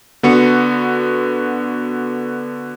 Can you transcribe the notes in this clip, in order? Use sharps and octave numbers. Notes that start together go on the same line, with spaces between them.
D3 B3 F#4 C#7